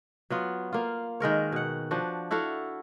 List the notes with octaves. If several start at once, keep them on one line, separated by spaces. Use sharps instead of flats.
F#3 B3 F4
A#3 F4
D#3 G#3 A#4 C#5
B2 F#5
F3 D4 F#4
E4 F#4 A4 F5